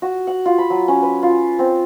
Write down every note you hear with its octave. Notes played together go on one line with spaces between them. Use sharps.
F#4
F#5
F4
B5
F#3
C#4
B4
F4
C4